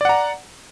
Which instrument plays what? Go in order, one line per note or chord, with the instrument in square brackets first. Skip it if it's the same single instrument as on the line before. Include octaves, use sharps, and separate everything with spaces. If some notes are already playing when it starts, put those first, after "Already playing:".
[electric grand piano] D5
F#5
A#5